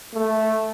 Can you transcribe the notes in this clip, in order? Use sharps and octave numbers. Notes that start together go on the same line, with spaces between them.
A3